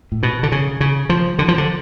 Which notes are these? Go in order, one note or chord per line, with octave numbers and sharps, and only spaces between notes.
A2
B2
D3
C#3
C#3
F3
D3
F3
D3